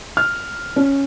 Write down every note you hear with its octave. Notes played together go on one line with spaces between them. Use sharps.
F6
C#4